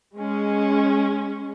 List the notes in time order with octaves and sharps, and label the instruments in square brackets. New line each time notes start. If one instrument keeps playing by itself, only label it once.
[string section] G#3 C#4